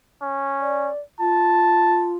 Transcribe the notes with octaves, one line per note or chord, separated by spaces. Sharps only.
C#4
D5
F4 A5